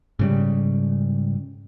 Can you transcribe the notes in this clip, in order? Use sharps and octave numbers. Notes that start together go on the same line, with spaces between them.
G#2 C#3 G3